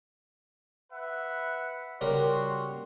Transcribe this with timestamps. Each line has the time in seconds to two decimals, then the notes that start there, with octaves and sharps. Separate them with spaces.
0.92 B4 E5 F#5
2.01 C#3 G3 F#4 A#4 C6